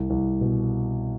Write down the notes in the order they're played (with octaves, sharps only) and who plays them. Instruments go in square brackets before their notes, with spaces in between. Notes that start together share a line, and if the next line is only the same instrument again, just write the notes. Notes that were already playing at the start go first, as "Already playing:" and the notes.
Already playing: [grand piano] C2
C2
B2